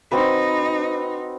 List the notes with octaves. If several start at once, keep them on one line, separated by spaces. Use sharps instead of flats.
C4 D#4 F#4 B4